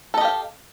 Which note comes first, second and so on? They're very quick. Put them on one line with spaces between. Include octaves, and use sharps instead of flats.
A4 D#5 G4 F5